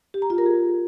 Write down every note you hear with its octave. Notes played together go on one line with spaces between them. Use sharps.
G4
A#5
F4
A#4
G#4